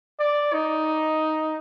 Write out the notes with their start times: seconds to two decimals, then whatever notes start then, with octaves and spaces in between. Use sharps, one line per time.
0.20 D5
0.53 D#4